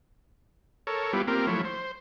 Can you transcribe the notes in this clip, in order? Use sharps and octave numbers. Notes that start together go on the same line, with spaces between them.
A4 A#4 C#5
G3 B3 E4 F4 G4
A#3 C4 F4 G4 A#4
F3 F#3 A3 E4 C#5
C5